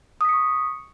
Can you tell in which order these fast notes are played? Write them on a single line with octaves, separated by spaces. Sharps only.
D#6 B6 C#7 C#6